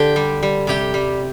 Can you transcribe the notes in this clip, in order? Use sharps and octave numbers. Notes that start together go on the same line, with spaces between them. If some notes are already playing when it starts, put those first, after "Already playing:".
Already playing: D3 G4 G5
G3
G3
C3 G4 G5
G3